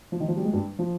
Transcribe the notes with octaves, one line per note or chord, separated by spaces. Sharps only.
F3
D#3
F3
G3
G#3
G2 G3
F3